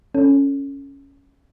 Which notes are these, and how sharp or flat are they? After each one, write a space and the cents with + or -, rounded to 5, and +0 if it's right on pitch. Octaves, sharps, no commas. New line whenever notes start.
C#4 +0 A4 +0